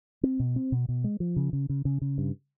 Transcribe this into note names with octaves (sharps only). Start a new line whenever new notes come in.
C4
B2
C4
B2
B2
G#3
F3
C#3
C#3
C#3
C#3
C#3
G2